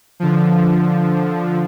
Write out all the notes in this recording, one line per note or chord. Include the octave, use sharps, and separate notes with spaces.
D3 F3